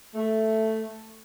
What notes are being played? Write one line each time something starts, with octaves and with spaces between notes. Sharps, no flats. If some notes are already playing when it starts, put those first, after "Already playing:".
A3